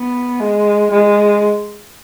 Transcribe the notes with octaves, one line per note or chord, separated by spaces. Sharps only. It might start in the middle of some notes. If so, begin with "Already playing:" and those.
Already playing: B3
G#3
G#3